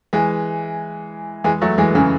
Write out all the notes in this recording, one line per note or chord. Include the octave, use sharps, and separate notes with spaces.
E3 G#3
E3 G#3
F#3 A3
E3 G#3
C#3 E3